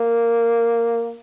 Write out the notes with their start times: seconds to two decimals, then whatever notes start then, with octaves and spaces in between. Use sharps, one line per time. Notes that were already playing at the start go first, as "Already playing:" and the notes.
Already playing: A#3